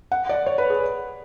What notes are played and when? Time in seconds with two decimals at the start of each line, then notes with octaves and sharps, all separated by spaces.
0.12 F#5
0.29 D5
0.46 C#5
0.58 B4
0.70 G#4